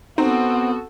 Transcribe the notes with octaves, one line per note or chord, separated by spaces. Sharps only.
B3 C4 D#4 F#4 A4